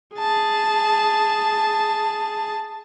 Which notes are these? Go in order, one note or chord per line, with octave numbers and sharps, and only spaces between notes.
G#4 A5